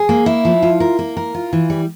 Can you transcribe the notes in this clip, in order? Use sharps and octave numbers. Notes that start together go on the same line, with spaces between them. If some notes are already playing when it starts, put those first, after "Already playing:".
Already playing: G#4
A#3
E4
F3
F4
A#4
A#3
A#4
F4
E3
G3